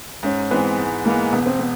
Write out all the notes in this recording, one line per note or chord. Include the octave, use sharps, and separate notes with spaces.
G#2 C#4
E3 G#3 B3 C4
G#2
E3 G#3 A#3 B3
E1 B3
C4
B3